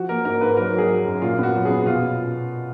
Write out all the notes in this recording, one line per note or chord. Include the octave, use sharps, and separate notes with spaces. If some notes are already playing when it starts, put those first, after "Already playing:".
Already playing: F3 F#4
A#3 A#4
G#2 A#4
G#2 B4
F#3 A#4
F#3
G#4
F#3
F#2
A#2 F4
B3 F#4
F#3
G#4
B3
B2 F4